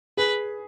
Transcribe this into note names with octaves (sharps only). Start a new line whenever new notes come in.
G#4 B4